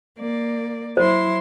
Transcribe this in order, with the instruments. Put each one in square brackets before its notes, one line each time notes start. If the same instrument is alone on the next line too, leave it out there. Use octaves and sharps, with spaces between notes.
[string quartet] A#3 D5
[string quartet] F#3 E4 C6 [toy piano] C5